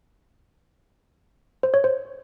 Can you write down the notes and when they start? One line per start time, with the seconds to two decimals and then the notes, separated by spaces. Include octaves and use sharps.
1.63 C5
1.74 C#5
1.84 C5